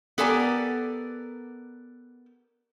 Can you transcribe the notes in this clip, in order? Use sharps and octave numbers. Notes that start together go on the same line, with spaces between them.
B3 G4 A4 A#4 D5 G#5